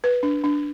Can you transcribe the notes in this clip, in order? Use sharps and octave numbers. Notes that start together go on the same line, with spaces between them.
B4
D4
D4